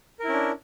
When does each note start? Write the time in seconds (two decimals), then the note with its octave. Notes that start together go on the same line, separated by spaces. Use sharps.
0.19 A#4
0.24 E4
0.28 C#4
0.33 D4